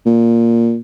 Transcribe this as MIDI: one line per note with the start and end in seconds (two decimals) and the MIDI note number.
0.06 0.79 46